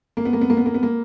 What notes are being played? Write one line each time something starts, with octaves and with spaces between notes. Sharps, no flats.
A#3
B3
A#3
B3
A#3
B3
A#3
B3
A#3